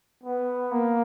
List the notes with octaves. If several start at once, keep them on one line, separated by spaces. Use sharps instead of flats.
B3
A#3